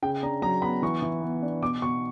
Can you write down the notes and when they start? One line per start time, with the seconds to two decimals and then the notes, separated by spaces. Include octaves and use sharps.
0.02 C#3 G5
0.23 D4 A#5
0.42 F#3 A#5
0.62 B3 B5
0.82 E3 C#6
1.02 E3
1.22 B3
1.42 D4
1.61 B2 D6
1.82 B2 C#6